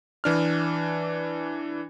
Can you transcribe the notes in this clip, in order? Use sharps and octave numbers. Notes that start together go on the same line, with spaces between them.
E3 D4 F6